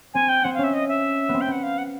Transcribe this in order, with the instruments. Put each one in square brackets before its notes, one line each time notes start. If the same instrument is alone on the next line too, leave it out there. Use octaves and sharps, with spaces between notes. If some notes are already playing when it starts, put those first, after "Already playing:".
[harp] C4 [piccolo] G#5
[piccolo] G5
[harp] C4 [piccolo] F#5
[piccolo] F5
[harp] C#4
[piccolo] E5
D#5
E5
[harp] B3
C4
[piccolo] G5
[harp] B3 [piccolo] F#5
[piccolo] F5
F#5